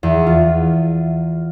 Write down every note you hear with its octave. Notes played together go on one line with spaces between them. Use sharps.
E2
F4